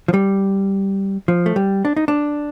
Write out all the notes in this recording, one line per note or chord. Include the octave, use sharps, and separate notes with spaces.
F3
G3
F3
A3
G3
D4
D#4
D4